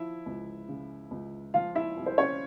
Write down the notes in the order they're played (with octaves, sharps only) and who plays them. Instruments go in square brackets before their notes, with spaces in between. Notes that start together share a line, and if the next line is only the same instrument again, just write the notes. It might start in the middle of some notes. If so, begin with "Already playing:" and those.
Already playing: [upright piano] F3 E4 E5
C#2
C#3
C#2
F3 F4 F5
E4 E5
C2
C5
C#4 C#5